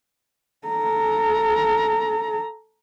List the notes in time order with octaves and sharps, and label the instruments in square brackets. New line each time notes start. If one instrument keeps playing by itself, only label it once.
[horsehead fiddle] A4 A#5